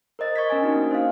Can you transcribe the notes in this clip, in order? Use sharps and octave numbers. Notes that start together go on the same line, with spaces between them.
A#4 C5 D#5 A6
C#6 G#6 B6
C#4 A#4 D#5 G#5
D4 D#4 F#4
A#3
C5 D#5 F5